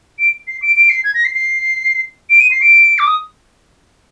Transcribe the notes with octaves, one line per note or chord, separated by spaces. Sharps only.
D7
C7
D7
D7
C7
G#6
A#6
C7
C7
D7
D#7
C7
D7
D6
D#6